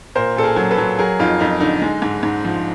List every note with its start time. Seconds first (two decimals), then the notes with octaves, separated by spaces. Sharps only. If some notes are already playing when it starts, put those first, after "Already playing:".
0.15 A#2 A#4 C5
0.36 A#2 A4
0.43 G#4 A#4
0.56 F#3
0.71 A4 B4
0.78 F#3
0.99 F#3 G#4 A#4
1.19 F2 D#4 F4
1.39 F2 D#4
1.60 D3 D#4
1.82 G#3
2.02 G#2
2.23 G#2
2.45 F3